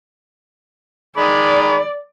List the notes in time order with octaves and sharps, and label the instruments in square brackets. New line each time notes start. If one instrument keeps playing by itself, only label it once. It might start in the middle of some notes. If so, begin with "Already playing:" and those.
[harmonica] D#3 G#3 B5 [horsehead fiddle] D5